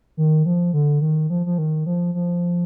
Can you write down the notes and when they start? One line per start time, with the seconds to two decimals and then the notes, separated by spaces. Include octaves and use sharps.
0.17 D#3
0.46 F3
0.73 D3
1.01 D#3
1.30 F3
1.46 F3
1.58 D#3
1.86 F3
2.14 F3